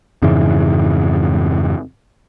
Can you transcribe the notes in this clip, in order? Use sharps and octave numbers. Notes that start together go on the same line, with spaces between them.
F2 G#2 C#3 E3